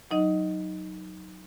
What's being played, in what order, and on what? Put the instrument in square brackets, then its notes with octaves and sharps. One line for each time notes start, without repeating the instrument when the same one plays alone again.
[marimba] F#3 D#4 D#5